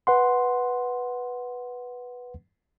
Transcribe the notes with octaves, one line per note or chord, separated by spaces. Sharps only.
B4 F#5 C6